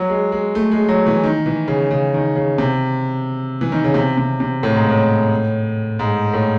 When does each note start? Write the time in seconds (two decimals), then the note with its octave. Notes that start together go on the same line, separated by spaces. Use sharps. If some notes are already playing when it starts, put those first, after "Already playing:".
Already playing: F#3
0.10 G#3
0.32 G#3
0.55 A3
0.72 G#3
0.89 F#3
1.07 E3
1.23 D#3
1.46 E3
1.68 C#3
1.91 C#3
2.14 D#3
2.36 C#3
2.58 C3
3.61 E3
3.72 D#3
3.84 C#3
3.94 C3
4.17 C3
4.40 C3
4.63 A2
4.76 G#2
4.89 A2
5.99 G#2
6.33 A2